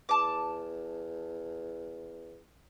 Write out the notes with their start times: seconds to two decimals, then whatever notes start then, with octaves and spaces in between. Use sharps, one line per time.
0.09 E2 A5 D6